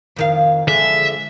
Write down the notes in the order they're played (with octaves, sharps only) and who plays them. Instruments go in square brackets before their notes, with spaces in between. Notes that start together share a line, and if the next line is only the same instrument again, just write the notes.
[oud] F2 D#3 F5
[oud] D3 F3 G#3 [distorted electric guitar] E5